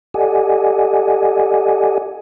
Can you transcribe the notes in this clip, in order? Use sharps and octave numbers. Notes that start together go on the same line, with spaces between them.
G4 A4 D5 D#5 F#5 G#5